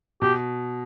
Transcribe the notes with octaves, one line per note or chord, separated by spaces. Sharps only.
B2 G4